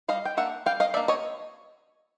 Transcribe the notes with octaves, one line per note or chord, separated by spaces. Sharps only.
G3 D#5 F5
G5
A#3 D4 E5 F#5
G3 F5 G5
D#5 F5
A#3 D4 D5 E5
C#5 D#5